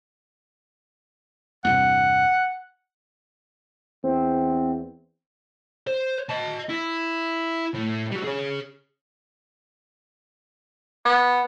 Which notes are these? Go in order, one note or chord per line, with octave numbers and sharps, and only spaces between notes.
E2 G2 C3 F#5
E2 C4
C5
D#5 A5
E4
A2
G3 F#4
G#4 C#5
B3